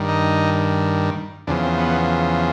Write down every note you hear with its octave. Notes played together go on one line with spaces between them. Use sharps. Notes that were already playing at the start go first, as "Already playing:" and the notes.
Already playing: G2 D#3
D#4
E2 C#3 F3 D4
C4
B3